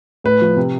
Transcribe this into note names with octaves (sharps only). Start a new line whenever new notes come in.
A2 B4
F3
C3